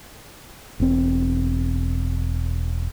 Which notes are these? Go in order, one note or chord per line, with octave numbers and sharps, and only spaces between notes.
E1 C4